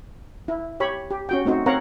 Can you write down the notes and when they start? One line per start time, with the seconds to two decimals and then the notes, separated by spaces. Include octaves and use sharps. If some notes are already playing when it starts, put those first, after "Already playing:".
0.48 E4
0.80 G4 C#5 B5
1.11 G4
1.29 C#4 F#4 G5
1.45 A3 C4 D#4 F#4 C5
1.66 C4 A#4 C#5 F5 F#5 A#5